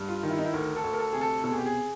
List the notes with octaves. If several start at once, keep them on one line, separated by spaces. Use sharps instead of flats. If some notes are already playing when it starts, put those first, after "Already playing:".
Already playing: G2
F4
D#3
E4
D#4
E4
D2 A#4
A4
D2
A#4
A4
C3 G#4
A4
B2 A4
G#4
G4
G#4